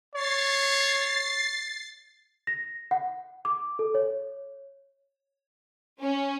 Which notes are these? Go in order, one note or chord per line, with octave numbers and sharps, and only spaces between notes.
C#5 A6 C7
A#6
F#5
D6
A4
C#5
C#4